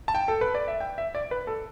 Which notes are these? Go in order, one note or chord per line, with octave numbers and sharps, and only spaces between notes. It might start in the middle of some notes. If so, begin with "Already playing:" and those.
A5
G5
A4
B4
D5
E5
G5
E5
D5
B4
A4